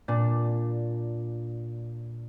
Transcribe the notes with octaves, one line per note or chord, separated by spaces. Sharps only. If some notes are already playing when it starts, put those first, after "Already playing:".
A#2 D4